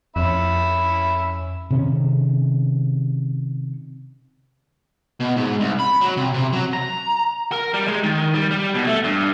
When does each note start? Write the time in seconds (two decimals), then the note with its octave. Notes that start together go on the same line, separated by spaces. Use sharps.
0.16 F2 C#4 E5 B5
1.71 C3 D#3 C#4
5.21 B2
5.37 G#2
5.60 C2
5.79 B5
6.01 F#3
6.17 C3
6.34 C3
6.53 F#3
6.73 A#5
7.52 A#4
7.74 G3
7.88 G#3
8.04 D#3
8.34 G3
8.51 G3
8.74 B2
8.87 A3
9.04 G2